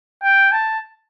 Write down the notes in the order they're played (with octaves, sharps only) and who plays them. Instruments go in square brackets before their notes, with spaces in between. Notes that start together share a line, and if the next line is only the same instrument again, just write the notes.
[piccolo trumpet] G5
A5